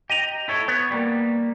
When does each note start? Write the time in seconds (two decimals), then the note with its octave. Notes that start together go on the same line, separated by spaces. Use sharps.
0.10 G4 D#5 A#5
0.48 E4 A4 C#5
0.68 B3 C#5
0.91 G3 A#3